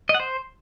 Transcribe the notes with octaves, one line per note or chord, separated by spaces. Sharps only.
D#5
F#5
C5